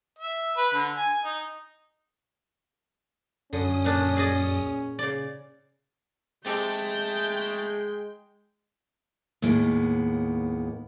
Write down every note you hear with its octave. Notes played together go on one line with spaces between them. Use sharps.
E5
B4
D3
G#5
D#4
F#2 D3 C#4 D#6
A#2 D4
G#4 D5 D#5
C#3 D5
G#3 A3 C4 G4 A4 G5
D#2 A2 G#3 A#3 B3